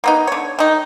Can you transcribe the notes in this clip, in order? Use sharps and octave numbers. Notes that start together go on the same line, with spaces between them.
A#3 B3 D#4
D3 C#5
D#3 D#4